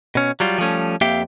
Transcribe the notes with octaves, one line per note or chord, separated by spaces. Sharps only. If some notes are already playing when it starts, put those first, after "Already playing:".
B2 C#4
F#3 G3 F4
F3 G3 A3 C#4
F2 A#3 G4 E5 F5 G5